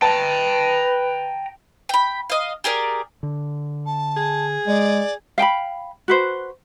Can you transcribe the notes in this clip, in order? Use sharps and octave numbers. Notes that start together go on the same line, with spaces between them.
B4 G5 A5 A#5
G5 B5
D#5 F5
G4 G#4 A#4 D5
D3
A5
G#4
G#3 D5
F5 G5 A5 B5
F#4 B4 C5